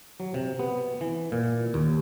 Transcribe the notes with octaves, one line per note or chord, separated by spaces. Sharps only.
F#3
C3
B3
E3
A#2
D#2